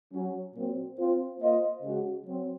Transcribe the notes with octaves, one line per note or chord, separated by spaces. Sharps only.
F#3 C#4 F#4
A#2 F#3 C4
C4 F4 C5
A#3 F4 C5 D#5
C#3 G#3 C#4 F#4
F#3 C4